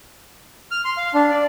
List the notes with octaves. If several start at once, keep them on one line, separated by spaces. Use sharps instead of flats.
F6
C6
F5
D4
D5